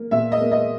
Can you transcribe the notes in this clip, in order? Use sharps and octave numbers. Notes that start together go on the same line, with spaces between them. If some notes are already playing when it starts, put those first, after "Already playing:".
Already playing: A#3
A#2 E5
D#5
A#3
D#5